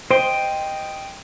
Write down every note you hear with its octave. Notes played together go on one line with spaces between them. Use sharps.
C5 D#5 G5 C6